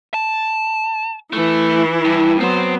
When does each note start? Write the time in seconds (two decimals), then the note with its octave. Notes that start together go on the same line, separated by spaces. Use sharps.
0.14 A5
1.33 E3 A3 E4
2.05 G2
2.40 F#3 B3 C4 C5